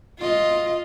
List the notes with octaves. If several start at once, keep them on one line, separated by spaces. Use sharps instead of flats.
F4 D#5